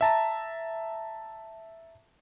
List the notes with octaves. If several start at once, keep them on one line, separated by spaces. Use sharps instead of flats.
E5 A5 A#5